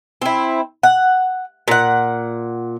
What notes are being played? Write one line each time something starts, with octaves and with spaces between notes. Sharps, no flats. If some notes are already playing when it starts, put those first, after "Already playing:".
C4 E4
F#5
A#2 F#5